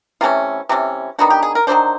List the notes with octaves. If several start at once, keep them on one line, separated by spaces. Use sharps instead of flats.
C3 E3 A3 C#4 F4
C3 E3 A3 C#4
D#3 F#3 B3 D4 F#4
G4
G#4
A#4
D#3 F#3 B3 D4 C5